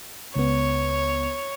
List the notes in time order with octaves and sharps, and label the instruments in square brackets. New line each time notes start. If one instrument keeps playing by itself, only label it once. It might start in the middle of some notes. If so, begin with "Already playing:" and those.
[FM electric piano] C#2 B3 [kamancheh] C#5